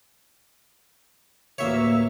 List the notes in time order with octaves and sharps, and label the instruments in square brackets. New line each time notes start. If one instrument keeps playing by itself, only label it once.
[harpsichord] A1 D2 C#5 [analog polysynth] A#3 E5